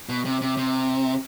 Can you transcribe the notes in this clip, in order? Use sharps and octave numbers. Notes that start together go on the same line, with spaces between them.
B2
C3
C3
C3